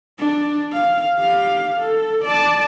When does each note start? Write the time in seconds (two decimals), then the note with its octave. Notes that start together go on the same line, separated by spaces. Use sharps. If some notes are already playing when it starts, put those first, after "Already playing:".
0.19 D4
0.73 F5
1.18 G4 F5
1.77 A4
2.25 D5 A5